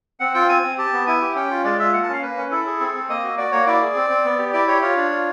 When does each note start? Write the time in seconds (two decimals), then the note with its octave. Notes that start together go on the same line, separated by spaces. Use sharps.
0.20 C4 F#5
0.34 F4 G5
0.49 C4 G#5
0.63 C4
0.78 G4 A5
0.93 B3
1.07 E4 G#5
1.21 G4
1.35 C#4 G5
1.51 F4
1.64 G#3 D5
1.79 F4 E5
1.93 A#3 F#5
2.03 A5
2.09 C#4 F5
2.22 A#3 B4
2.37 C#4
2.51 E4 A4
2.66 G#4
2.80 C4
2.95 C4
3.09 A#3 D#5
3.23 F#4
3.37 F#4 D5
3.52 A#3 C#5
3.67 E4 D5
3.82 G#4
3.95 C4
4.10 C4
4.25 B3
4.39 G4
4.53 E4 D5
4.68 G4 C#5
4.82 F4 C#5
4.97 D4
5.11 F4